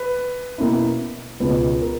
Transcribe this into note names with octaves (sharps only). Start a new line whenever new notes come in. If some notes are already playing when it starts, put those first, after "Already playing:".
Already playing: B4
B2 A#3 C#4 E4
C#2 B2 G#3 C#4 B4
A#4